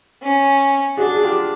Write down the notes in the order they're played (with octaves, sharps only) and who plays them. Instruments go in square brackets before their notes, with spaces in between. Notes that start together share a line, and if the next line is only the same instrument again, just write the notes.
[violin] C#4
[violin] D4 [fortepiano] F#4 G#4
[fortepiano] G#4
F4 G4